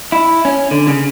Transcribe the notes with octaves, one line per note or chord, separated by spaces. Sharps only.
E4
C#4
D3
C#3